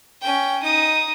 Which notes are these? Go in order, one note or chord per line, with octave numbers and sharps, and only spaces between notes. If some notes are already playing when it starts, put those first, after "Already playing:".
C#4 G5
D#4 D#6